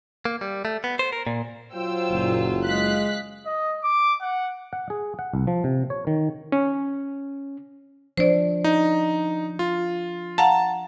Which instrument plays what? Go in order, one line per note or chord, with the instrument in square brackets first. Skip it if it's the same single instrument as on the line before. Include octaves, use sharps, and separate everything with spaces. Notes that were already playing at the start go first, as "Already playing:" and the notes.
[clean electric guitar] A#3
G3
A3
B3
C5
A#4
A#2
[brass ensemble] F#3 F4 [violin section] C5 G5 E6
[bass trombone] F#1 [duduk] A#2
[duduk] G#3 [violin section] F5 F#6 B6
[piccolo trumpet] D#5
D6
F#5
[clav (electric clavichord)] F#5
G#4
F#5
C2
F3
C3
C#5
D#3
[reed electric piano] C#4
[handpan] F3 D4 [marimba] C5 D5
[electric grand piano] D#4
F4
[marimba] F5 F#5 A#5 [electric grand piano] A5